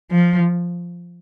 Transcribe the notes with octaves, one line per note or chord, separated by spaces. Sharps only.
F3